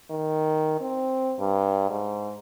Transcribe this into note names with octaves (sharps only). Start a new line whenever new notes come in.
D#3
C4
G2
G#2